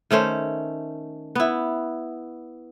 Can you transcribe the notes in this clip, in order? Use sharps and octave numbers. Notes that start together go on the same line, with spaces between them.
D#3 A3 C#4 C5
B3 E4